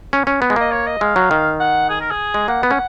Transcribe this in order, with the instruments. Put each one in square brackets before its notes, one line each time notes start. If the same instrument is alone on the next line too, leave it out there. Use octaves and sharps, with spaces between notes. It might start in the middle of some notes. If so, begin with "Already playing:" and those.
[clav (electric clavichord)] C#4
C#4
B3
G#3
[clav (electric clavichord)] A#3 [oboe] D#5
[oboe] C#5
D#5
[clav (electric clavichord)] G#3 [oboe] F5
[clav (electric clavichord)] F#3
D#3
[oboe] F#5
G#4
A#4
G#4
[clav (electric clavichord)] G#3
[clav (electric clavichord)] A#3 [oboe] F#5
[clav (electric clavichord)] B3
C#4